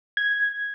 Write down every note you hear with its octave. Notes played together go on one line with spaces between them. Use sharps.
G#6